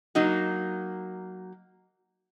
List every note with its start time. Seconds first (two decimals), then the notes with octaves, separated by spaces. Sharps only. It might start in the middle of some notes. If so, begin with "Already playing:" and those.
0.15 F#3 A#3 D#4 F#4